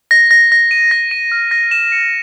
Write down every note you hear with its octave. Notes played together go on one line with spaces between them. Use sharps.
A#6
A#6
A#6
D#7
A#6
D#7
F6
A#6
E7
C#7